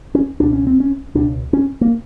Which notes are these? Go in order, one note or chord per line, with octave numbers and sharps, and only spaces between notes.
C#4
C#2 B2 D4
C#4
C4
C#4
C#2 B2 D4
C#4
A#3